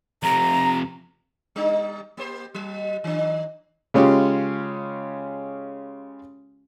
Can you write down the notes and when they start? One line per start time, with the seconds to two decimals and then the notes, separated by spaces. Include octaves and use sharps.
0.23 F2 C3 A#5
1.56 G3 D4 D#4
2.17 A#3 G4 C5
2.54 F#3
3.04 D#3 D4
3.94 C#3 G#3 C#4 F4 G4